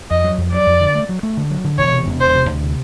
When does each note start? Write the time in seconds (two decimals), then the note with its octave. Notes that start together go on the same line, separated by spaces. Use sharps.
0.11 F2 D#5
0.24 F#3
0.38 F2
0.52 F#3 D5
0.67 F2
0.80 D3
0.95 A3
1.09 F#3
1.23 A3
1.37 D3
1.51 F#3
1.65 D3
1.78 E1 C#5
1.92 C3
2.07 E1
2.21 E1 C5
2.35 C3
2.49 D2
2.63 C3